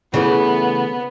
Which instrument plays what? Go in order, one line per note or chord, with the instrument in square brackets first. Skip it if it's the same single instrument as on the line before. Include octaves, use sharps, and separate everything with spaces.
[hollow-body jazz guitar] C#3 E3 A3 [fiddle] B3